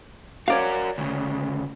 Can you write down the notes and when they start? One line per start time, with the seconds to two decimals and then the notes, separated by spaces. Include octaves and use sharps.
0.48 F#4 A#4 C#5 D5 F5
0.98 D2 C#3